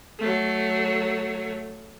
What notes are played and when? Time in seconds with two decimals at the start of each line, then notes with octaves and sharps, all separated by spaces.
0.19 F#3 A3